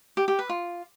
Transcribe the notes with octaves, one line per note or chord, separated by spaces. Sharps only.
G4
G4
B4
F4